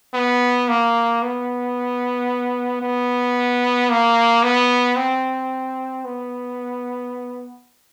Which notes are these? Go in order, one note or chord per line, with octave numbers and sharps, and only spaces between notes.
B3
A#3
B3
B3
A#3
B3
C4
B3